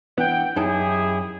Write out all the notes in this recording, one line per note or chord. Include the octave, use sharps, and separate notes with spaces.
E3 B3 D4 F#5 G5
F#2 D#4 E4 G4 G#4 A5